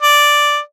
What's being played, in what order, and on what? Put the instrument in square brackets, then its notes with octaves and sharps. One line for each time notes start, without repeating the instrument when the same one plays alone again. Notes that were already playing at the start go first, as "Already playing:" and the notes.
[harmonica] D5